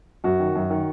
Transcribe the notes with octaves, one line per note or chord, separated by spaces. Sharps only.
F#2 F#4
D#3
F#2
D#3